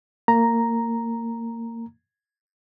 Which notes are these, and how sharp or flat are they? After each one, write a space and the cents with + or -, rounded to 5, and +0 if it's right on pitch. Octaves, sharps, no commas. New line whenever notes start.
A#3 -25 A#5 +0